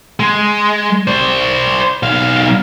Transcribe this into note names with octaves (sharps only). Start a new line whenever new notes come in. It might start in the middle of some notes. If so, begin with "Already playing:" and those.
G#3
C5 D5
B1 F5